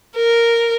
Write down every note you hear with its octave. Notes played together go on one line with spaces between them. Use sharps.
A#4